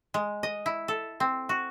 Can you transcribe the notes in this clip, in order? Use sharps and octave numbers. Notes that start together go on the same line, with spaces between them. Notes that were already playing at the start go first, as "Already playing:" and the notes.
G#3
D#5
E4
A4
C4
F#4